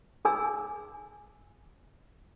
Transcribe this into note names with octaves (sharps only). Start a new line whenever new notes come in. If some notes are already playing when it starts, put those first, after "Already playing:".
D#4 G#4 G#5 E6